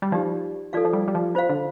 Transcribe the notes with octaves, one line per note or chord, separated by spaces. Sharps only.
G3
F3 D#4 G4 D5
F3 A4 D5 F5
F3
G3
G3
F3
F4 C5 F5
D3